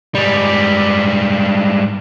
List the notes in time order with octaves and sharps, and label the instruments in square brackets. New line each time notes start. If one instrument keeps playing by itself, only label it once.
[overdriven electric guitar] G#2 G3